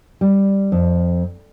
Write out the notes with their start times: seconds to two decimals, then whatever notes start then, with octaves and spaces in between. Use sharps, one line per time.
0.21 G3
0.72 F2